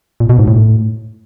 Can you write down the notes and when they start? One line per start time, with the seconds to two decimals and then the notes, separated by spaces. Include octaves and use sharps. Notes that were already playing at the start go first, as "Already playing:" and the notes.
0.20 A#2
0.29 B2
0.39 G#2
0.48 A2